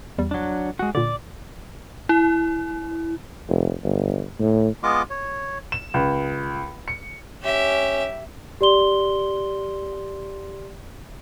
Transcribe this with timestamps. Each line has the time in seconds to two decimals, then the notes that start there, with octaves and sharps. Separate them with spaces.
0.18 E2 G3
0.31 F#3 D4
0.79 G#3 F#4
0.95 A#2 D3 D5
2.09 E4
3.48 F1
3.84 G1
4.39 A2
4.83 G#3 B3 F4 D#5 D6
5.10 C#5
5.72 E7
5.94 C#2
6.88 C#7
7.43 C#4 G4 E5
8.61 G4 D5 C6 G7